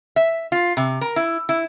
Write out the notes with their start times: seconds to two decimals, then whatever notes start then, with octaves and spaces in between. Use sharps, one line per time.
0.16 E5
0.52 F4
0.77 C3
1.01 A#4
1.16 E4
1.49 E4